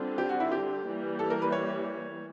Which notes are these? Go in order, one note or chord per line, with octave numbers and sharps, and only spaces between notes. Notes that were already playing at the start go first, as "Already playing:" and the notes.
Already playing: D3 G3 C4 F4
G4
F#4
E4
G4
E3 G3 A#3
A4
A#4
B4
C#5